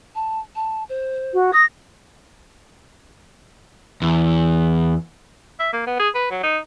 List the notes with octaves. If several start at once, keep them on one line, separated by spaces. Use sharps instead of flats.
A5
A5
C5
F#4
D#6 A#6
E2
E5
A#3
B3
G#4
B4
F#3
D#4